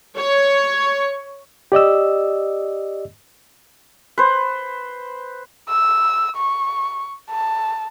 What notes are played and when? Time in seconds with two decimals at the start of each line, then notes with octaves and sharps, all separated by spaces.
0.17 C#5
1.72 G4 D5 D#5 E6
4.18 B4 C5
5.69 E6
6.36 C#6
7.30 A5